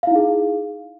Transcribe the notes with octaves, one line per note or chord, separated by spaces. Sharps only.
D#4 E4 G#4 F5